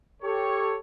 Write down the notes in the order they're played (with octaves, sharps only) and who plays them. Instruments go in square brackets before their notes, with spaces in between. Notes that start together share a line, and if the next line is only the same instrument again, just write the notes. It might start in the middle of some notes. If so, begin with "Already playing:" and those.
[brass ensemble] G4 A4 C#5